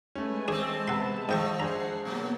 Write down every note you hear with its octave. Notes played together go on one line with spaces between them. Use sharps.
G#3 A3 C#4 B4 G#5
G#3 A3 C4 D4 G#4 A5 D6
C3 B3 F#5 B5 C6
G#2 F3 A3 D#5 G5 C#6
D4 G#4 C5 F#5 A#5 C7
B2 F#3 A#3 B3